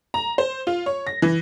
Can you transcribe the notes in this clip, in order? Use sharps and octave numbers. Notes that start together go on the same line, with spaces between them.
A#5
C5
F4
C#5
A#6
E3